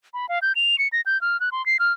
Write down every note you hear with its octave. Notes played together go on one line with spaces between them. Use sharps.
B5
F5
G6
F7
C#7
A#6
G6
F6
F#6
C6
C7
F6